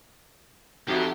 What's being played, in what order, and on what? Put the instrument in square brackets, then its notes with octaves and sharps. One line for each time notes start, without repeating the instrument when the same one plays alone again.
[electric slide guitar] F2 [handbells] D#4 A4 E5 [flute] F#4 [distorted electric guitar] G4